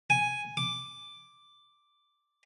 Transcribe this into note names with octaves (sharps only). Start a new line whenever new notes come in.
G#5
D6